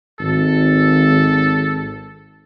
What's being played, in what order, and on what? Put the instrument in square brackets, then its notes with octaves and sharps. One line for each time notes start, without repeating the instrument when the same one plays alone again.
[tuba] G#1 [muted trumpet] A4